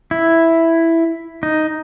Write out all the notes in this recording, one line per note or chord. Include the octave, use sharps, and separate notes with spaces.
E4
D#4